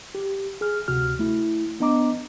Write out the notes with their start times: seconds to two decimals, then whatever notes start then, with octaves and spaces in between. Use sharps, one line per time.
0.15 G4
0.61 G#4 F6
0.88 D2 C3 F#4 F6
1.19 A3 E4
1.80 B3 D4 D#5 A#5 D6